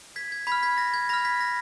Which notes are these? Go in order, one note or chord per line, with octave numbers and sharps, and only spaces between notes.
G#6 B6
G#6
B5 F6 G#6 B6
G#6 B6
A#6
G#6
B5 F6 A#6
G#6 B6
A#6